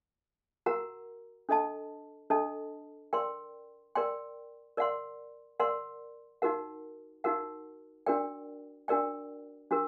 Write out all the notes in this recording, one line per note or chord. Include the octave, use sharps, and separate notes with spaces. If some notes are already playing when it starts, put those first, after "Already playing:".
F#4 A#4 F#5 A#5
D4 A4 D#5 A5
D4 A4 D#5 A5
A#4 D5 G5 C6
A#4 D5 G5 C6
A#4 D5 F#5 C6
A#4 D5 F#5 C6
D#4 F#4 A#4 F#5
D#4 F#4 A#4 F#5
D4 F#4 A#4 D5 G5
D4 F#4 A#4 D5 G5
D4 F#4 A#4